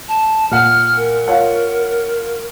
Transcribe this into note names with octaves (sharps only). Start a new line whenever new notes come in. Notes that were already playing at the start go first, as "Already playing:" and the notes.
A5
A#2 F#5 F6
A#4
F4 C#5 F#5